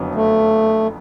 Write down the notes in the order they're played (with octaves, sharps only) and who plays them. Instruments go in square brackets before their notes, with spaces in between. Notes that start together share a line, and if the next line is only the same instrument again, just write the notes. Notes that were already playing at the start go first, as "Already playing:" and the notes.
Already playing: [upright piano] F#1 F2 D3 F#3 B3
[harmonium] A3